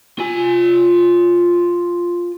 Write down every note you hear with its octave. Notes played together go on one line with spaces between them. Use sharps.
F4 G#5